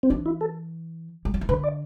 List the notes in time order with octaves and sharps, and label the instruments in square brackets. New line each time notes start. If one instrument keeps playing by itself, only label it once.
[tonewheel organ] C4
[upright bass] E3 [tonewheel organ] D4
[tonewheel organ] E4
A4
[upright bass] G3
F#3
E3
[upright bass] D3 [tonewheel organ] B4
[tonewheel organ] D5